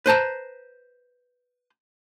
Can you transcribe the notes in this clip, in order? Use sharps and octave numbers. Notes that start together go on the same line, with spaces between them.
B4 C5 A5 A#5